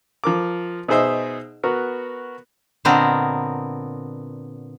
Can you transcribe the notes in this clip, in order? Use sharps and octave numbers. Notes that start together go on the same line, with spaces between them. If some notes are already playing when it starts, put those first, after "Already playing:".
F3 A#4 D6
B2 D#4 G#4 C5 E5 E6
B3 F#4 A#4
A#2 D3 B3 C4 A#4 D#5